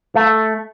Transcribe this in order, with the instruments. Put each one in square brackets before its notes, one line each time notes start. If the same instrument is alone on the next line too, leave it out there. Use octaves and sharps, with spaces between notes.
[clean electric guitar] A3